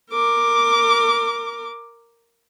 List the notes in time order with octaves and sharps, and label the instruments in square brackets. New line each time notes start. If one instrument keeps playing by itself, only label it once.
[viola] A#4 D6